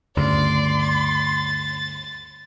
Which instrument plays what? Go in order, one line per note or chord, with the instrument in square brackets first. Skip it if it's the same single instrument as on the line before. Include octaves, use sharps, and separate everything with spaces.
[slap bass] D2 G2 C#3 [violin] D5 [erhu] C6
[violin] A6